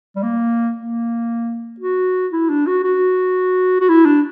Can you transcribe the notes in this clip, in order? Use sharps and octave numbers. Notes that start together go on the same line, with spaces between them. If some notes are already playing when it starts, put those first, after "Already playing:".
G3
A#3
A#3
F#4
E4
D4
F#4
F#4
F#4
E4
D4